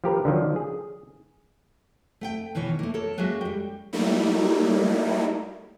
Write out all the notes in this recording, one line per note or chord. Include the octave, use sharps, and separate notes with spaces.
F3 G4 A#4 B4
D3 D#3 F3 F#3
G#4
A3 F#5 G5
B2 D#3 E3 C#5
A3 A#3
A4 A#4 C#5 A5
F#3 G#3 A#3 C#4 F#4 E5
G3 G5
F#3 G3 A3 A#3 D#4 E4